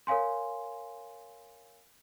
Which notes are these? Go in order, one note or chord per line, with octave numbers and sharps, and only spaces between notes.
A#4 C#5 F5 G#5 C6